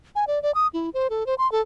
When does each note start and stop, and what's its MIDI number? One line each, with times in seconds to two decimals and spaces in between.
0.15 0.25 80
0.27 0.42 74
0.43 0.51 74
0.55 0.67 87
0.74 0.90 64
0.94 1.08 72
1.10 1.26 69
1.26 1.35 72
1.38 1.50 84
1.52 1.62 69